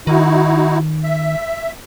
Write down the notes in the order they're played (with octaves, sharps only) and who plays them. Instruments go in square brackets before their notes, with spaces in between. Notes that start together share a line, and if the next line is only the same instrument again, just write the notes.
[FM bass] D#3 [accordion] D#4 E4 F#4
[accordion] E5